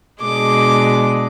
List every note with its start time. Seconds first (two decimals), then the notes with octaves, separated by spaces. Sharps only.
0.21 B2 G#3 D4 D6